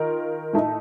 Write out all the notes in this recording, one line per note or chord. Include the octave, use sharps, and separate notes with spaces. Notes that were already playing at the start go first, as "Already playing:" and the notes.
Already playing: D#3 F4 A#4
A2 A3 D#4